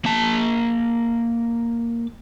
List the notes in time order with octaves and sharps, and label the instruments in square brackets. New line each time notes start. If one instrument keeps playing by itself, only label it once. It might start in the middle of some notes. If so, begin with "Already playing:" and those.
[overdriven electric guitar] A#3 A5